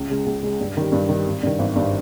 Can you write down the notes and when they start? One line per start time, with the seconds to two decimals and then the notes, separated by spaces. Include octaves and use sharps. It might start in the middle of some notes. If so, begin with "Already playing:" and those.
Already playing: C#2
0.10 C#3 G#3
0.26 C#2
0.43 C#3 G#3
0.60 G2
0.77 D#3 G3
0.92 G2
1.09 D#3 G3
1.26 G#1
1.43 G2 D#3
1.59 G#1
1.76 G2 D#3